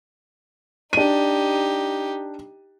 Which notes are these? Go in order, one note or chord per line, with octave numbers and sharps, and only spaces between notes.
D4 D#4 G4 D#7